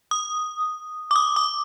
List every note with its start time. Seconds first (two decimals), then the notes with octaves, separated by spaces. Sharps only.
0.11 D#6
1.11 D6
1.16 D#6
1.36 D6